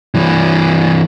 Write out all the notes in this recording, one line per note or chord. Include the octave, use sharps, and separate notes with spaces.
G2 E3